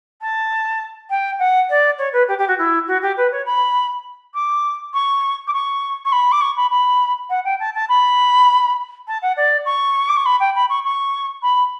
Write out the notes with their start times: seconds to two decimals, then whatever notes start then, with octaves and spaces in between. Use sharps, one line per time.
0.21 A5
1.10 G5
1.39 F#5
1.70 D5
1.98 C#5
2.13 B4
2.28 G4
2.38 G4
2.48 F#4
2.58 E4
2.87 F#4
3.02 G4
3.17 B4
3.32 C#5
3.46 B5
4.34 D6
4.94 C#6
5.47 D6
5.53 C#6
6.05 C#6
6.12 B5
6.32 D6
6.41 C#6
6.57 B5
6.71 B5
7.29 F#5
7.44 G5
7.60 A5
7.75 A5
7.89 B5
9.08 A5
9.22 F#5
9.37 D5
9.65 C#6
10.09 D6
10.16 C#6
10.26 B5
10.40 G5
10.55 B5
10.69 C#6
10.84 C#6
11.42 B5